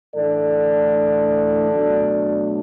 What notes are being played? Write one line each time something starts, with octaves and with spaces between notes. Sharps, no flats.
A2 E3 A3 D4 A4 D5
B2 F#3 A3 D4